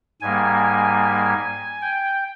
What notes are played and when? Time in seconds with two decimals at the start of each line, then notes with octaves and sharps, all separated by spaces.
0.21 G#2 G3 A#3 G#5
1.82 G5